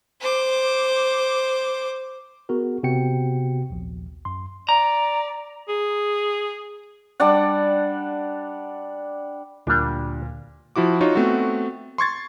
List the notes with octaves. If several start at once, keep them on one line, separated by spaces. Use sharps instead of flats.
C5 D6
B3 F#4 G#4 A#4
C3 B3 F#4 G5 C#7
A#1 D#2
F#2 C6
D5 A#5
G#4
G3 D4 D5 F#5
D2 A#2 G3 D4
F3 E4 F#4 D6
D#4 F4 F#4 C#5
A3 B3 C4 F#4
C6 C#6 G#6 A6